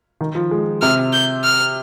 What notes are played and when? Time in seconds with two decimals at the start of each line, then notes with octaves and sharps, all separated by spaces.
0.21 D#3
0.35 F3
0.51 G#3
0.82 C3 F6
1.13 G6
1.44 F6